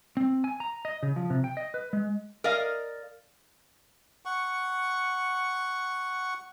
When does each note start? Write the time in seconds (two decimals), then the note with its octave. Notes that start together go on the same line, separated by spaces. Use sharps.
0.17 C4
0.44 G#5
0.60 A#5
0.85 D#5
1.03 C#3
1.16 F3
1.30 C3
1.44 G5
1.57 D#5
1.74 B4
1.93 G#3
2.44 A#4 D5 D#5 F5
4.25 F#5 C#6